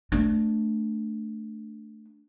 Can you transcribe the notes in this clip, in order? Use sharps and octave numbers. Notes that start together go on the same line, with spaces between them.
A3 D4